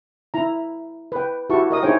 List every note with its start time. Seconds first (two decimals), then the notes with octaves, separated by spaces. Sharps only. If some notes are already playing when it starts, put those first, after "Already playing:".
0.34 E4 A#5
1.12 B4 G5
1.50 E4 F#4 G4 A5 C#6
1.70 A#4 D#5 D#6
1.83 D#4 E4 G#4 C5 C#5 G5